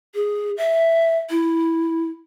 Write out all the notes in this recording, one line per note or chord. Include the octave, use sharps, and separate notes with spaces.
G#4
E5
E4